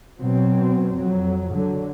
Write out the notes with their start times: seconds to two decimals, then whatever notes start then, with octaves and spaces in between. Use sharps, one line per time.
0.19 B2 F#3 C4
0.95 F2 F#3
1.52 D3 F#3